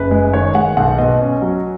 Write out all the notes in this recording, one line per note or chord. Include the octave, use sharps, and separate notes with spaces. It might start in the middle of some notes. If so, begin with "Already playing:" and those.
Already playing: F#1 B4
G#3
D#3 C#5
G#3 F#5
B1 F#5
B2 D#5
C#4
F#3